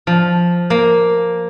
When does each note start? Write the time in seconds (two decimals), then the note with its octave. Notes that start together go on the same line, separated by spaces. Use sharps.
0.07 F3
0.70 A#3